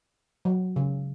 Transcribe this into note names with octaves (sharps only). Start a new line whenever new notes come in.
F#3
C#3